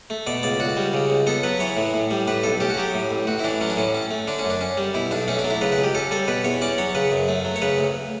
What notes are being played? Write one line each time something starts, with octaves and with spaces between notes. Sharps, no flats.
A3
B2 D5
C#2 D5
C#2 F#4
G3
C#3
C#2
B3 A4
F#3 B4
E3 C#5
A2
A2
G3
A2 B4
B1 A4
C#4 G4
F#4
F#3 G4
A2
A1
A1 F#4
E4
E3 D4
F#3 C#4
D4
A2 C#4
C#4
A3
D3 D4
C#4
F#2
D4
C#4
G3
B2 E4
B1 D4
A3 C#4
D4
F#3
E4
C#3 B4
B4
C#2
G4
C#4 A4
G3 A4
B2 B4
E2 C#5
C#4 D5
F#3 C#5
C#3 B4
F#2
A3
F#3
C#5
C#3 B4
D2